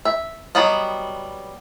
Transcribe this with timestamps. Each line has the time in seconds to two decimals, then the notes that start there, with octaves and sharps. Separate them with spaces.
0.05 E5
0.55 F#3 G3 B3 D#5